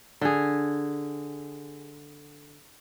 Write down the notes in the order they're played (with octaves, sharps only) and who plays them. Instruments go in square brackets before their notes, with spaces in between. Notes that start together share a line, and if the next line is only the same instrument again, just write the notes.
[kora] D3 G#4